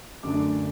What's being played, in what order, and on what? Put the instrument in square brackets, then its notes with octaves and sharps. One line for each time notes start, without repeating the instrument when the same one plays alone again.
[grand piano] F#2 D3 A3 D4 D6